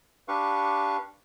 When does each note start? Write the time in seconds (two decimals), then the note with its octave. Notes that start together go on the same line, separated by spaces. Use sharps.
0.28 D4 G4 B4 F5 C#6